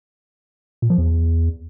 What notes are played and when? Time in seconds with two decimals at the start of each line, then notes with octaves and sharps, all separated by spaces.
0.82 A#2
0.90 F3
0.98 E2